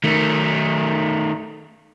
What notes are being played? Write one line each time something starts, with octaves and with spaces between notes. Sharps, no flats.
D#3 A3